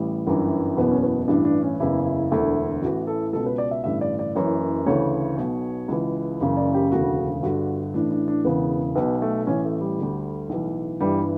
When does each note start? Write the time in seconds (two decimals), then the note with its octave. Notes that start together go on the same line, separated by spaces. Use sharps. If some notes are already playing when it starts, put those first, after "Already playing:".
Already playing: A1 A2 E3 G3
0.27 G1 F#2 E3
0.77 F#1 E2 B2 B3
0.91 C#4
1.03 B3
1.28 A1 G2 E3 D4
1.45 D4
1.62 C#4
1.80 F#1 E2 C#3 E3 E4
2.05 E4
2.31 E1 D2 D3 E4
2.82 A1 A2 E3 F#4
3.07 A4
3.33 C#2 B2 A4
3.46 B4
3.58 D5
3.71 E5
3.84 A1 G2 D3 E5
4.01 D5
4.19 D5
4.35 F#1 F#2 E3 C#5
4.86 D2 C#3 E3 C#5
5.37 B1 B2
5.88 C#2 C#3 E3
6.40 F#1 F#2 C#3 E3
6.57 D5
6.74 G4
6.92 E1 D2 C#3 F#4
7.42 G1 G2 D3 F#4
7.94 A1 A2 E3 D4
8.11 D4
8.28 D4
8.44 E1 E2 C#3 E3 B3
8.95 B1 B2 B3
9.22 A3
9.47 A1 A2 E3 C#4
9.65 A3
9.81 G3
9.99 D2 D3
10.49 B1 A2 E3
11.00 G1 G2 E3 G3